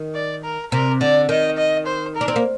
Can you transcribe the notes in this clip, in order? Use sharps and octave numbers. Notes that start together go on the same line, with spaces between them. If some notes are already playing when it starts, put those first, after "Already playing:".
Already playing: D#3
D5
A#4
C3 A#4
D3 D5
D#3 D#5
D#5
C5
A#4
D4
C4
A#3